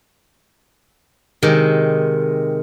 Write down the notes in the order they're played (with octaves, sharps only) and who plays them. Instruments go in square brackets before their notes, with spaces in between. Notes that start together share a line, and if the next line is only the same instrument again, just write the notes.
[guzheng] C3 D#3 G#3